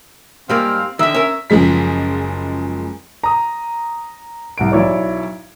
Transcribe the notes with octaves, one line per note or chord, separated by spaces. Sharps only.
G#2 G3 A#3 C4 F5
D3 D#3 E5
C#4 A#4
F#1 C#3 F3 G#3 B6
A#5 D#6
C2 F#5 D7
B1 E4 C#5 D5